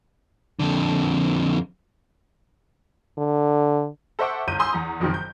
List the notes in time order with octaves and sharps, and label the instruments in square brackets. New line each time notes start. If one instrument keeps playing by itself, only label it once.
[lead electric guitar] F2 D3
[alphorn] D3
[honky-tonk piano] A4 C5 E5 F#5 C#6 D6
G1 C2 G6 D#7
G#5 B5 C6 D#6 E6 G6
E2 A#5
F#1 F2 B2 D#3
G6